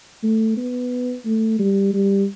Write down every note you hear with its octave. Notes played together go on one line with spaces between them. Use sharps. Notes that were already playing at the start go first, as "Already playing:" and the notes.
A3
B3
A3
G3
G3